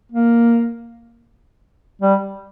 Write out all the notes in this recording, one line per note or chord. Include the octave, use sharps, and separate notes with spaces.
A#3
G3